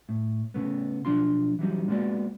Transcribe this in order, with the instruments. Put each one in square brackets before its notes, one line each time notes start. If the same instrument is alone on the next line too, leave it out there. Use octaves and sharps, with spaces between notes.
[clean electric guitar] A2
C#3 A3 B3
B1 E2 F3 D4 F4 C6
E3 F#3 G3 D#4
G#3 A#3 B3 F#4 D5